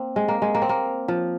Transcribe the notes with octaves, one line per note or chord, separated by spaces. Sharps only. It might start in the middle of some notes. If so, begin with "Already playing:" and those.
Already playing: A#3 C4
G#3
A#3
G#3
A#3
C4
A#3
F3